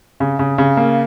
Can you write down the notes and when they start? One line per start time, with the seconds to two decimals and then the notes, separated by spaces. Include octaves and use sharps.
0.20 C#3
0.39 C#3
0.58 C#3
0.77 A#3